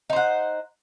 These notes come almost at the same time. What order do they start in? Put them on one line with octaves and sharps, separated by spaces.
D#4 C5 F#5